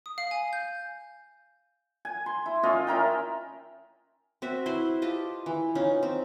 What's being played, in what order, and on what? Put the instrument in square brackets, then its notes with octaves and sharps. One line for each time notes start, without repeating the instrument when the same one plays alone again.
[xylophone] D#6
F5
G#5
G6
[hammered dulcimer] G#5
C6
E4
C#4 F4 D#5 E5
C#4 E4 A#4 G5
[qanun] C4 F#4 E5
E4 B4 C5 C6
F4 G4 D#5 A5
E3
C#4 D#4 F4
C4